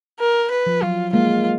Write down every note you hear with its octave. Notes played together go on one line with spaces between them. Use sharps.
A#4
B4
F3
F#3 F4
G#3 A#3 F4